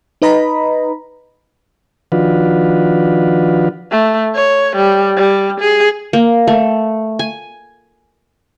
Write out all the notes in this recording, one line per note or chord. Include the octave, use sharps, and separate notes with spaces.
D#4 B4 D#5 A#5 B5
D#3 F3 D4 F4 F#4 B4
A3
C#5
G3
G3
G#4
A#3
A3
G#5